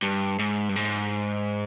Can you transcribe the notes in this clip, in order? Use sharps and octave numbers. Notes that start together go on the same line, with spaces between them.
G2
G#2
G2
G#2